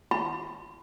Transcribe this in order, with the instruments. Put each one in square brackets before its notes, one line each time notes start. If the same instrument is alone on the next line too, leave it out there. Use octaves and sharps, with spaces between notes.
[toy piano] B5